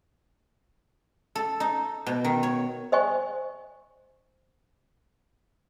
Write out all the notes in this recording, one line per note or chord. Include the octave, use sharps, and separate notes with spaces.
A4
D#4
B2
D#3
C#5
C5 D#5 G#5 C#6